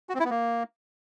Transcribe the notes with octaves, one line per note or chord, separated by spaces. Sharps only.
F#4
C4
E4
B3
A#3